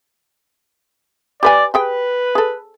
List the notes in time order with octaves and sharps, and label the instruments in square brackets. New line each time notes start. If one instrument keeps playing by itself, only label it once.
[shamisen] G4 B4 G#5 [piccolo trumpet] D5
[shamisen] G4 G#4 G5 [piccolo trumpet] B4
[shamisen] G#4 A4